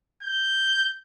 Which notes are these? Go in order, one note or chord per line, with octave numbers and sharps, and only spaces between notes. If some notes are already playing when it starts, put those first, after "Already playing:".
G6